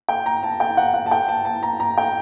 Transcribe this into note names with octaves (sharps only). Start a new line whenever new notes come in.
G5
A#5
A5
G5
F#5
F#5
A5
G5
A5
A5
A#5
A#5
G5